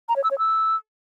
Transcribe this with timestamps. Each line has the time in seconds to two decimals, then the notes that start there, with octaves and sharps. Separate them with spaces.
0.09 A#5
0.16 C#5
0.24 E6
0.31 C#5
0.38 E6